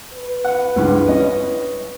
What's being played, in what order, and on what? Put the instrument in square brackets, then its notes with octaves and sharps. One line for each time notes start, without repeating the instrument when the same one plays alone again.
[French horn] B4
[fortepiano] F#5
C#2 G2 E3
C#4 D#5